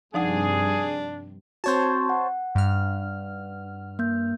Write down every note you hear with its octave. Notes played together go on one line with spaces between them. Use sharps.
G2 C3 F3 D4 D#4 G#4 F#5
C4 F#4 C5 C#5 A5
F#5
G2 F6
A#3 G6